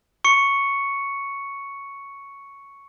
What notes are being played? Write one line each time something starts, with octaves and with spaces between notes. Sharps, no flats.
C#6 C#7